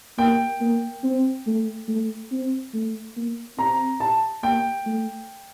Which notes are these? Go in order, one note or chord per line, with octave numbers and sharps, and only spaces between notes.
A#3 G5
A#3
C4
A3
A3
C4
A3
A#3
C4 A#5
A5
A#3 G5
A3